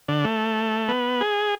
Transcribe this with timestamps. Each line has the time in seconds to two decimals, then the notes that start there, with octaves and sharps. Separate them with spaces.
0.08 D3
0.24 A3
0.88 B3
1.21 G#4